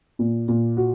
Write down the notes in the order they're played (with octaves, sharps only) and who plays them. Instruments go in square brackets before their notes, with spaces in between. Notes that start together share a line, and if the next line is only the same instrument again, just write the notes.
[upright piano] A#2
A#2
F#4